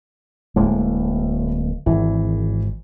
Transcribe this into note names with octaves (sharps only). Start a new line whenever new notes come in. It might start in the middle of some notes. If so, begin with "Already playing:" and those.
D1 A2 G#3 A#3
G#1 E3